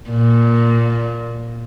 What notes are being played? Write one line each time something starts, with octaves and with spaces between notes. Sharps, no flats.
A#2